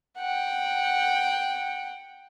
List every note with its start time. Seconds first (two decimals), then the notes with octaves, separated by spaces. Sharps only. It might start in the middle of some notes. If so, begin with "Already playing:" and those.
0.19 F#5 G5